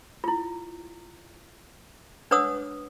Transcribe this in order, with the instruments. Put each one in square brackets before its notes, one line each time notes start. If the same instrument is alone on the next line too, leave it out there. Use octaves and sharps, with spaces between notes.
[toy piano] E4 F4
D4 B4 C#5 F#5 D#6 E6